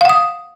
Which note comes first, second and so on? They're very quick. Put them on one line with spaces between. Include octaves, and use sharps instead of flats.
F5 F#5 D#6